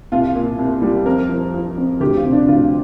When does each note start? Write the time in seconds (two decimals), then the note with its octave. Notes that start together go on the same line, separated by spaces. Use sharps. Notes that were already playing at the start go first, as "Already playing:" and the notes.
0.12 C2 F4
0.35 A#2
0.59 C2
0.82 G3
1.05 F2 A#4
1.29 F3
1.54 F3
1.77 F2
2.00 D2 G4
2.16 F4
2.25 C3
2.32 D4
2.48 D2 F4